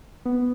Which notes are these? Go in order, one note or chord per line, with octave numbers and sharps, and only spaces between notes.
B3